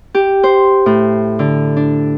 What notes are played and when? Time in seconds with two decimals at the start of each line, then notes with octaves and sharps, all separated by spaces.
0.15 G4
0.43 C5
0.86 A2
1.39 D3
1.77 D4